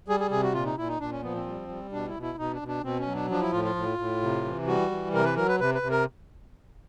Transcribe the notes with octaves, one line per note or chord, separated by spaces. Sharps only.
G3 G#4
G#4
C3 G#4
F#4
A#2 F4
D#4
A#2 E4
D#4
A#2 D4
C#4
F3 B3
C4
G3
G3
B2 D4
E4
B2
E4
B2 D#4
D4
B2
D4
B2 C4
C#4
F#3
D4
F3 D4
E4
A2 F4
F4
A2
A2
C3
E3
G3 F#4
E3
C3 A#4
B4
F#3 A#4
B4
C3 B4
B4
C3
A#4